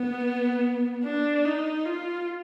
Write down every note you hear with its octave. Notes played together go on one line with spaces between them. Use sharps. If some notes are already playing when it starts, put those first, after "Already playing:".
Already playing: B3
D4
D#4
F4